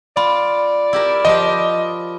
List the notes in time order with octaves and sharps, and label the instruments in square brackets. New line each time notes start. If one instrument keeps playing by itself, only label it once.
[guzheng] F4 [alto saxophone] D5 [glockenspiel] B5
[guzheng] E4 G4 A#4
[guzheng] F3 F4 G4 [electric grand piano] D#5